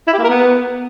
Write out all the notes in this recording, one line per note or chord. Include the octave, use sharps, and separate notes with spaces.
E4
G4
A#3
A#4
B3